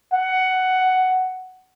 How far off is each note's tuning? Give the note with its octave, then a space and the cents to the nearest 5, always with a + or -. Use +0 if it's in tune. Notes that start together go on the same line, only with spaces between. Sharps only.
F#5 +10